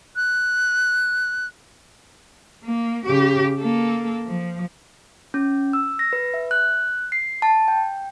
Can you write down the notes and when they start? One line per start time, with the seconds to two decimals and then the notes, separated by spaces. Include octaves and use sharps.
0.16 F#6
2.63 A#3
3.06 C#3 G4
3.59 A#3 A4
4.26 F3
5.34 C#4
5.73 E6
5.99 A#6
6.13 B4
6.34 E5
6.51 F#6
7.12 C7
7.42 A5
7.68 G5